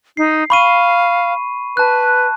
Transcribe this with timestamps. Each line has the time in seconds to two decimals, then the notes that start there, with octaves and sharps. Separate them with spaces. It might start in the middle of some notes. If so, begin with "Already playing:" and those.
0.17 D#4 C7
0.50 F5 B5 C#6 D#7
1.77 B4 A5 F#6